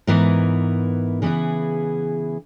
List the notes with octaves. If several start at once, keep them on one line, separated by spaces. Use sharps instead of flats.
G#2 E3 B3 E4 A#4
C#3 E3 B3 E4 G#4